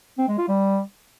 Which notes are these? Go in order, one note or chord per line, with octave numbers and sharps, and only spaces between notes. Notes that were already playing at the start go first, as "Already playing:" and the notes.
C4
G#3
F4
G3